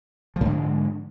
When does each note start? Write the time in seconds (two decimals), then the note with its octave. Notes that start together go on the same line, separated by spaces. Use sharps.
0.36 F3
0.41 G#2
0.45 D3
0.50 G#3